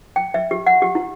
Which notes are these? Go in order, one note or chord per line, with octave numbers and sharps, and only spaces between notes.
G5
E5
G4
F#5
G4
E4